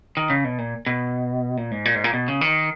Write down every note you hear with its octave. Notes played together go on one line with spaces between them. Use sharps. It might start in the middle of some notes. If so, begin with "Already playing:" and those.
D#3
C#3
B2
A#2
B2
A#2
G#2
A#2
G#2
A#2
B2
C#3
D#3